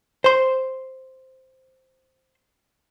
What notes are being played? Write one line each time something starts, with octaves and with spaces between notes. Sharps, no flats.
C5 C6